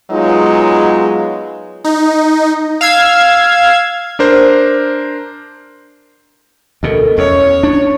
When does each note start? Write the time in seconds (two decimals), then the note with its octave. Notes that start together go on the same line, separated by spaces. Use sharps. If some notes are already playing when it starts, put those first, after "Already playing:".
0.11 F#3 G#3 B3 D#4 F4
1.84 D#4
2.81 F5 E6 G#6
4.19 D4 A#4 C5
6.83 D2 B2 A4 A#4 D#5
7.18 E2 C#4 C#5
7.63 D4